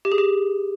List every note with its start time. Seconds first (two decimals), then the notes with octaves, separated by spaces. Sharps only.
0.05 G4
0.12 G#4
0.18 G4